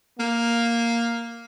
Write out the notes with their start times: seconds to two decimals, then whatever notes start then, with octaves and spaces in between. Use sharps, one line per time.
0.18 A#3